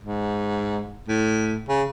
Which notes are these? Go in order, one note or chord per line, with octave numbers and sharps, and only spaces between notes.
G#2
A2
C#3